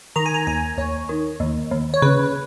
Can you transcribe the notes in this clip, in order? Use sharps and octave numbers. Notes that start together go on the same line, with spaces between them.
D#3 A#5
G#5
A#5
D#2 G#5
D#2 C#5
D#3
D#2
D#2
C#5
C#3 B4